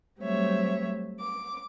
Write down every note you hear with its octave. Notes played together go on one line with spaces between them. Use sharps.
F#3 G3 A3 C4 C#5 E5
D6